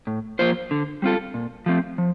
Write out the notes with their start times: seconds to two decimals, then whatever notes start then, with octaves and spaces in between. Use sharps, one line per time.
0.07 A2
0.39 F3 A#3 F4 C5
0.71 D3
1.02 G3 C4 F4 A4
1.34 A#2
1.66 F3 A3 C4
1.98 F3